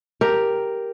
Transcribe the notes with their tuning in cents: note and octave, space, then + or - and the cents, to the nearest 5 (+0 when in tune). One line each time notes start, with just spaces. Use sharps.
G4 +0 A#4 +0